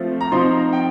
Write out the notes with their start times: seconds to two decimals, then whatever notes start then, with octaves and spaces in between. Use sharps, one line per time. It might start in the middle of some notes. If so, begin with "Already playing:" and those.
Already playing: F3 A3 C4 F4
0.21 A#5
0.32 F3 C4 D#4 C6
0.57 A#5
0.73 G5